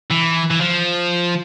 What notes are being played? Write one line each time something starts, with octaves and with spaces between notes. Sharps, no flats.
E3
E3
F3